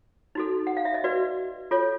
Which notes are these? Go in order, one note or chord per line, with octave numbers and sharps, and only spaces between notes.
D#4 F#4 A4
F#5
F5
E5
D#5
F#4 B4 D5
F4 A4 C#5